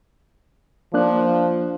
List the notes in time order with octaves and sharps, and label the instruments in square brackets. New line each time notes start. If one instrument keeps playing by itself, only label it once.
[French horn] F3 [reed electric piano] A#3 D4 F#6